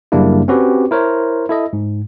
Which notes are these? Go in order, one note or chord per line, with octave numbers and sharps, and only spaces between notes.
F#2 C#3 G3 A#3 D4 E4
C4 C#4 F#4 G4 B4
E4 A#4 C5 C#5
E4 A4 D#5
G#2